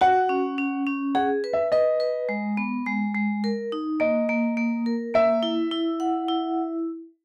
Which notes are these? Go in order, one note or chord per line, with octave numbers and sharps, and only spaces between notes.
F#4 F#5
C#4
C#4
C#4
G#4 F#5
B4
E5
B4 D#5
B4
G#3
B3
G#3
G#3
A#4
D#4
A#3 D#5
A#3
A#3
A#4
A#3 E5
E4
E4
F#5
E4